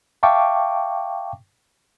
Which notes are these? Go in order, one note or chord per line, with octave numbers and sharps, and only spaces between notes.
E5 F5 G5 A5 C#6 D6